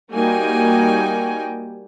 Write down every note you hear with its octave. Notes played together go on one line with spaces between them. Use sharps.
G3 A#3 D#4 F#4 G5 G#5